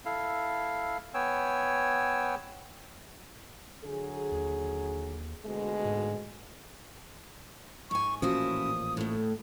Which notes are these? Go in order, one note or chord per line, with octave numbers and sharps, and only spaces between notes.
E4 A4 F5
B3 C#5 G5 G#5 E6
D3 F#3 G#4
D#2
D2 B2 G#3
G#2
G#2 G#5 C#6
A1 A#2 F3 C#4 E4 F#4 D#6
A2 A3